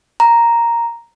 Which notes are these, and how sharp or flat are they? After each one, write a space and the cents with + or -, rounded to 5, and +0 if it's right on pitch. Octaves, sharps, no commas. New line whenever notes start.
A#5 +0